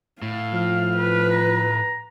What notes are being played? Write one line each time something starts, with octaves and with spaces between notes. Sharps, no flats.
A2 F5
F3 F6
B4
A#5